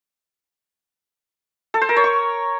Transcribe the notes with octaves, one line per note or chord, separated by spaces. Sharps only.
A4
C5
A#4
C#5
C#6